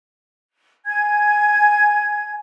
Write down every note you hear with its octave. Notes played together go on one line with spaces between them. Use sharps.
G#5 G#6